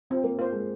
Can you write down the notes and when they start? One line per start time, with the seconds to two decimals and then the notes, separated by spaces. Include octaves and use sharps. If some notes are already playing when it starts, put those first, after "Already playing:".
0.10 C4 F4
0.24 A#3
0.38 A#3 F4 C5
0.52 G#3